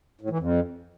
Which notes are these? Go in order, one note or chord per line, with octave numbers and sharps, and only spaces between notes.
A2
E3
F2